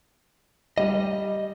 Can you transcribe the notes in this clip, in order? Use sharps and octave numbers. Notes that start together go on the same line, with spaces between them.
G3 D#5